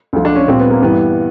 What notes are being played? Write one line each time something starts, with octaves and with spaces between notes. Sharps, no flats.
D2 D3 F3
D4
C#4
A#2 G3 C4
B3
A#3
G2 E3 G3 B3